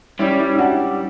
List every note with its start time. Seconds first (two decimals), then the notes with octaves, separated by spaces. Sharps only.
0.19 G3 C#4 E4
0.39 C#4 E4
0.53 E4
0.59 D4 F#4